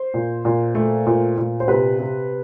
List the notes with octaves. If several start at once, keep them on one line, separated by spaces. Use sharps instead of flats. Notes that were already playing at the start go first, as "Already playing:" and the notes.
Already playing: C5
A#2
A#2
A3
A#2
A#2
C5
C3 B4
C3